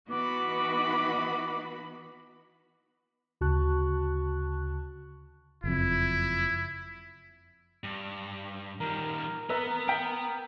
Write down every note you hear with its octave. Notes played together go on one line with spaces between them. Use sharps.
E3 B3 D#4 F#4 B5 D6
D2 C#3 F#4 A5 C#6 F#6
F#1 F2 E4
G2
D#3 G3 A#4
B3 B4 A#5 E6
B3 G5 B6 D7